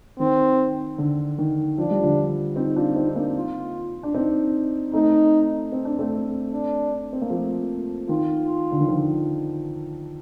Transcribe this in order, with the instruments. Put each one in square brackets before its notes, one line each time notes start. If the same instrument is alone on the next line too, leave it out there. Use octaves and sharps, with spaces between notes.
[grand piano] D#3 [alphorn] C4
[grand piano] D3
D#3
[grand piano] F3 [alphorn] D4
[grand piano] G3
D3 F3
C4 D#4
D4 F4
C4 D#4
D#4
A#3 D4
[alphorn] F4
[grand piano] D4
C4 D#4
[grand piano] A3 C4 [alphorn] D#4
[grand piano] C4
D4
A3 C4
[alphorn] D4
[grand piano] C4
A#3
F3 A3
[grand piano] D#3 [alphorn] F4
[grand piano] D3
D#3
D3 F3